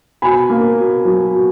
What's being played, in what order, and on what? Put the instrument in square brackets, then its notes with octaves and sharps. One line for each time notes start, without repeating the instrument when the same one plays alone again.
[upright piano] B2 G#5 B5
A#3
B2
F#3
B2